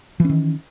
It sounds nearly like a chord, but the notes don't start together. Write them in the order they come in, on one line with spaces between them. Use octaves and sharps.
E3 C#4 D#3